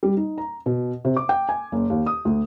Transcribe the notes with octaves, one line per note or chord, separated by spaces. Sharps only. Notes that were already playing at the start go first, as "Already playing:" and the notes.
G3
D#4
A#5
B2
C3
D6
G5
G#5
F#1
D#2
D#6
D2